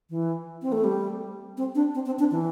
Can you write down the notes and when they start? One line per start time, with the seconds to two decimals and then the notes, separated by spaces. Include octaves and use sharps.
0.10 E3
0.62 C4
0.72 A3
0.84 G3
1.57 C4
1.75 D4
1.95 C4
2.06 C4
2.19 D4
2.31 E3